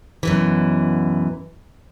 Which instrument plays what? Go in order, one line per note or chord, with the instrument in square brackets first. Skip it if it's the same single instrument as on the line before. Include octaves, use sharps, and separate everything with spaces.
[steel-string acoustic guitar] F#2 B2 E3